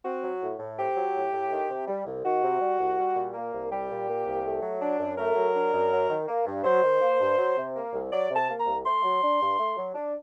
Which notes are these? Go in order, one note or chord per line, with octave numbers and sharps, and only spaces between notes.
C4 F#4
F#3
A2
A2
C4 G4
F#3
A2
A2
D#3
C3
G3
C2
D#3 F#4
C3
G3
C2
G3
A#2
A#3
C2
G3 G4
A#2
A#3
C2
A3
F#3
D4
F#2
A3 A#4
F#3
D4
F#2
F#3
D#3
A#3
G2
F#3 C5
D#3
A#3
G2
F#3
C3
A#3
C2
F#3 D5
C3
A5
A#3
A#5
C2
A3 C6
F#3
D4
G2
A3
F#3
D4